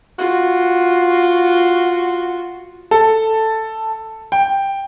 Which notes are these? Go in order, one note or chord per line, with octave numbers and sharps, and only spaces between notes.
F4 F#4
A4
G5